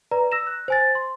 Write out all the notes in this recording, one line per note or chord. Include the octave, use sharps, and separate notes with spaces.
B4 D5 A#5
E6 A#6 E7
F#6
C5 G#5 A6
C6